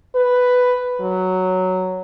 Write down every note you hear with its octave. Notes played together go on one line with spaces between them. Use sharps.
B4
F#3